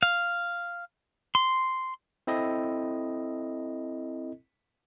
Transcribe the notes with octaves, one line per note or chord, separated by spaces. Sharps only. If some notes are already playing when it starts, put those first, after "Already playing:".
F5
C6
C4 E4 A4 D#5